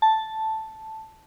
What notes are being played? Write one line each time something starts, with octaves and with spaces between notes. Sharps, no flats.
A5